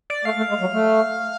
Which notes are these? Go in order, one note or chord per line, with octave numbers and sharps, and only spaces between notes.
D5
A3 F5
A3
G#3
F#3
A3